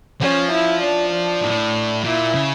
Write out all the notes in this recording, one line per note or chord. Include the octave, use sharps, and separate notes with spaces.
F3 C#4
E4
D4
D4
A2
A#2 E4
C#3